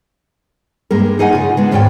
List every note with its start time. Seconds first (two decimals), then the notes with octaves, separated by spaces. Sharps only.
0.91 G2 G#3 A#3 A#4
1.19 D#4 G#4 D#5 F#5 G#5
1.33 C#3 F4
1.57 G#3 B3 D4
1.71 D#2 G#2 F4 C#5 D5 G5